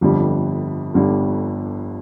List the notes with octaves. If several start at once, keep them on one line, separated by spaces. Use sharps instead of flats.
G1 F2 D3 G3
G1 D3 G3